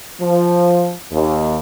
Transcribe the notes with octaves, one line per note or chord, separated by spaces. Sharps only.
F3
D#2